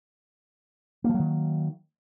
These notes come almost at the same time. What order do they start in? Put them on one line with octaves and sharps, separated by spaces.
A#3 F3 F#3 D#3